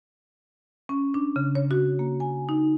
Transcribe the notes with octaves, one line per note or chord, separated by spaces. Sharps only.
C#4
D4
C#3
C#5
F#4
A#3
G#5
D#4